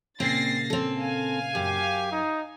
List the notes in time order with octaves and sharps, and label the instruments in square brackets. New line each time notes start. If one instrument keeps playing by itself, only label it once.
[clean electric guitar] A#2 C#3 A#3 [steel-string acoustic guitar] C4 [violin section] A6 A#6 C7
[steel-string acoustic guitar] C4 A4
[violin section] F5 G#5
[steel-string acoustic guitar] F#2 [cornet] G4
[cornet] D#4